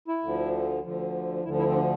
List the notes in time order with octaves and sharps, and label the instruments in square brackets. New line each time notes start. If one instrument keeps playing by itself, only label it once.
[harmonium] E4
D2 D3 F3
D2 D3 F3
D2 D3 F3 E4
E4
C4
D4